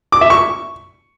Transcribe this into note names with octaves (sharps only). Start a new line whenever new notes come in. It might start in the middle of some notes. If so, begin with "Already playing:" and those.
D6
E5
C#6